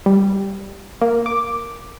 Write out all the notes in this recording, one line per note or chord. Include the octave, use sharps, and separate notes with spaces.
G3
A#3
D6